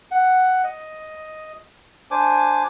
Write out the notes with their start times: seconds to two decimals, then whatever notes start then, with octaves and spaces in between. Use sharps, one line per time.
0.11 F#5
0.64 D#5
2.11 D4 C5 G#5 D6